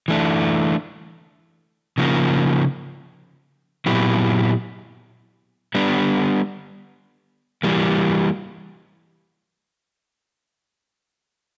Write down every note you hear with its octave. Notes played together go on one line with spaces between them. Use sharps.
E3 A3 D4
C#3 F3 A#3
A#2 F#3 B3 E4 G4
G3 B3 D4
E3 G3 A#3